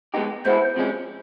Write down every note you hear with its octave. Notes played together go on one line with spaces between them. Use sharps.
G#3 B3 D#4 G4
B2 G#3 B3 E4 C5
C3 F3 G#3 C#4